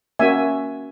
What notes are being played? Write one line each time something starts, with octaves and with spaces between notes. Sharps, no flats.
A#3 C#4 F#4 E5 G#5